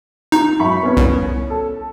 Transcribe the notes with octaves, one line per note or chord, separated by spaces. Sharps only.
D#4
F#2 B5 C#6
B3 C#4
C2
A4